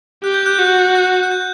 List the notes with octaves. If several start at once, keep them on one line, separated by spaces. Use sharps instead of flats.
G4 F#6
G6
F#6
F#4 G6
F#6
F#6
G6